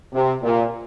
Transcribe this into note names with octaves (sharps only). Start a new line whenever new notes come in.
C3
A#2